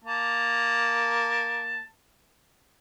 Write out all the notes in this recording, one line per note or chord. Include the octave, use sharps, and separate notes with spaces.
A#3 A5